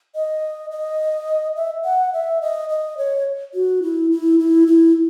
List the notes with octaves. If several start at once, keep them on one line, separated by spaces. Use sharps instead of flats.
D#5
D#5
E5
F#5
E5
D#5
D#5
C#5
F#4
E4
E4
E4
E4